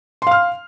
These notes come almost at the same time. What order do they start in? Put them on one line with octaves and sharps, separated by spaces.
C6 F5 F6